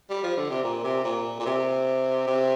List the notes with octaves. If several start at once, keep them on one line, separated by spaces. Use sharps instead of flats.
G3
F3
D3
C3
A#2
C3
A#2
A#2
C3
C3